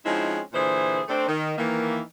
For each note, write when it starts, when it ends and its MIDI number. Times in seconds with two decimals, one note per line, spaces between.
0.05 0.39 53
0.05 0.39 56
0.05 0.39 60
0.05 0.39 61
0.05 0.39 63
0.05 0.39 64
0.53 1.01 46
0.53 1.01 50
0.53 1.01 52
0.53 1.01 68
0.53 1.01 72
1.08 1.27 57
1.08 1.27 60
1.08 1.27 62
1.27 1.52 51
1.57 2.00 51
1.57 2.00 52
1.57 2.00 58